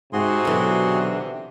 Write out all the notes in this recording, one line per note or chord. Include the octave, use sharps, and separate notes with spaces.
G#2 C3 F#4 G#4 C6
B1 D3 E3